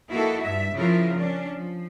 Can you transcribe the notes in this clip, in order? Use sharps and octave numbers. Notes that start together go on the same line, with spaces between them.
A#3 D#4 E4 F#4 A4
G2 E5
C#3 F3 E4 F4 A#4
C#4 D4
F3